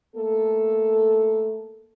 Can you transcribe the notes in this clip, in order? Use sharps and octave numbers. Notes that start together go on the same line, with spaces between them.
A3 A#3 A4